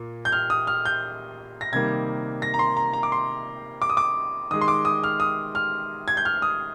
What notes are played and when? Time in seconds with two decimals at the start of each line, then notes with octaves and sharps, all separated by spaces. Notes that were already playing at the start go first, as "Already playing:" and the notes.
Already playing: A#2 A#3
0.25 G6
0.32 F6
0.50 D#6
0.67 F6
0.85 G6
1.61 A#6
1.72 C3 D#3 G3 A#3 G#6
2.42 A#6
2.54 A#5
2.59 C6
2.77 A#5
2.93 A#5
3.03 D6
3.12 C6
3.82 D6
3.90 D#6
3.97 D6
4.51 D#3 G#3 D#6
4.61 C6
4.68 D6
4.85 D#6
5.04 F6
5.20 D#6
5.55 F6
6.08 G#6
6.17 G6
6.25 F6
6.42 D#6